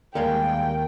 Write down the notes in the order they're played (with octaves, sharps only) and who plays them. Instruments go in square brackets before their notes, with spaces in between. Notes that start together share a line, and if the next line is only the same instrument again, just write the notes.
[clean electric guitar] D#2 [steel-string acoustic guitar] G3 G#3 [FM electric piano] A#4 F5 A#5 [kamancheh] G5